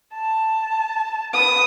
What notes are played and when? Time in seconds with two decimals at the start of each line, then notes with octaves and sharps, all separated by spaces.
0.15 A5
1.34 B4 D#6